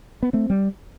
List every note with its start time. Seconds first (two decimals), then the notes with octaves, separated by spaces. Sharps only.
0.23 B3
0.33 A3 C4
0.50 G3